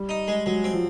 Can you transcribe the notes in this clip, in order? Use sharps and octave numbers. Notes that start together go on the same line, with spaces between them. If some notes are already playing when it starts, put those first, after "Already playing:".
Already playing: G3
D#4
G#3
F#3 G#3
C4
F3